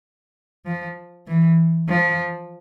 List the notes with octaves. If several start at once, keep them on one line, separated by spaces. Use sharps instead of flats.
F3
E3
F3